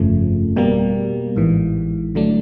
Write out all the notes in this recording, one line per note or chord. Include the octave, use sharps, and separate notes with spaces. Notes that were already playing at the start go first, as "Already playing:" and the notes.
Already playing: G1 F2 C#3 F3 A3
B2 G3 A#3
A1 G#2 E3
D3 F#3 A3 D4